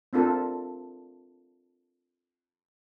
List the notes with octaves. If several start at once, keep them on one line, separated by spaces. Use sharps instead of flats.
C4 D4 F4 A4 A#4